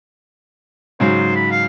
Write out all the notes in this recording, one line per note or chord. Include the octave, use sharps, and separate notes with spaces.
G#2 C#3 F#3 C5
B5
F5